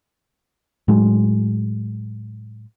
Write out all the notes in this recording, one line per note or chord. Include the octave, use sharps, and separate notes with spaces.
A2 F#3 G#3